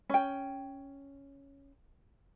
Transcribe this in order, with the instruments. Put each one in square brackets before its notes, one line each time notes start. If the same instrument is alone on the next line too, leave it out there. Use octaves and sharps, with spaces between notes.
[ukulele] C#4 G5